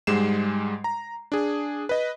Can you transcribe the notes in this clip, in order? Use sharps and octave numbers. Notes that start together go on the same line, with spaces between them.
G#2 G3 G#3 C7 E7
A#5
D4 G#4
B4 D#5